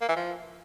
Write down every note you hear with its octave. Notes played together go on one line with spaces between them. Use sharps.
A#3
E3
F3